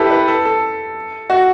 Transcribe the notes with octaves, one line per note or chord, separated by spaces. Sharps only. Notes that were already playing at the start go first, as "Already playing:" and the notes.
Already playing: E4 G4 A4 B4
B4
A4
A4
F#4